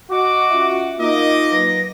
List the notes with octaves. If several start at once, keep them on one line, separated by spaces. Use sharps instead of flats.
F#4 D#5 F#5 C#6 D6
C#4 F4 E5
A#3 D#4 F4 D#5 D6
F#3 B4 A#6